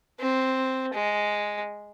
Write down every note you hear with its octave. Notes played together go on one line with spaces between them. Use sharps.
C4
G#3